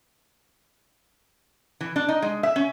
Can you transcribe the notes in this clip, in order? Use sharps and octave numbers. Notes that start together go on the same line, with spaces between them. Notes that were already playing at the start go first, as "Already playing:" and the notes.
E3
D4
D#4
G#3
E5
C#4